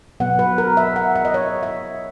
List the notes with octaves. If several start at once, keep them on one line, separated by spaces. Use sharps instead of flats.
B2 F#3 B3 F#5
B4
A#4
E5
F#5
E5
D#5
C#5
E5